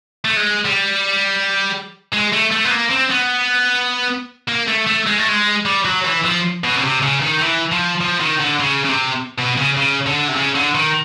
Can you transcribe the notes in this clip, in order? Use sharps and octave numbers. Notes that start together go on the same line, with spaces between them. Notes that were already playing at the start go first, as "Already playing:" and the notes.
A3
G#3
G3
G#3
A3
A3
B3
A#3
C4
B3
A#3
A3
A3
G#3
A3
G#3
G3
F#3
E3
F3
B2
C#3
C3
C#3
D#3
E3
F3
F3
D#3
D3
C#3
C#3
C3
B2
C#3
C#3
D3
C3
C#3
D3
D#3